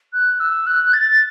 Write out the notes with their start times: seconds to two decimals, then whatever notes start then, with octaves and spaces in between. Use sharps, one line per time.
0.13 F#6
0.39 E6
0.66 F#6
0.92 A6